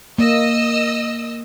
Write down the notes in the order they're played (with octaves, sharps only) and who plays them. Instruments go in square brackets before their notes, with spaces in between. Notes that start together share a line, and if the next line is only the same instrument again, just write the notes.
[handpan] A#3 [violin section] D#5 E6